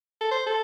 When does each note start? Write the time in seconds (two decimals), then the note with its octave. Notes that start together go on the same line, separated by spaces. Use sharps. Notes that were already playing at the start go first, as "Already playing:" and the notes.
0.21 A4
0.31 C5
0.46 A4